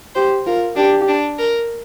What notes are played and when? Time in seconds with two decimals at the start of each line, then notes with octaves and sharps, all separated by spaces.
0.15 G4 C5
0.46 F4 A#4
0.76 D4 G4
1.08 D4
1.38 A#4